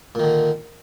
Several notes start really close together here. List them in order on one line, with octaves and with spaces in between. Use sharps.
A#2 D#3 D3